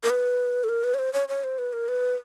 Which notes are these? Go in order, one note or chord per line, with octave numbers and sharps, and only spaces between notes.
A#4
B4
A4
A#4
B4
C#5
C5
C#5
C#5
C5
B4
A#4
B4